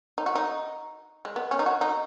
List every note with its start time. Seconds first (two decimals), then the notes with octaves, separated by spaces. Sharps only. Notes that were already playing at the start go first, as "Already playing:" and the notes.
0.18 D#4
0.26 F#4
0.35 D#4
1.25 G#3
1.36 B3
1.51 C#4
1.59 D#4
1.66 F#4
1.81 D#4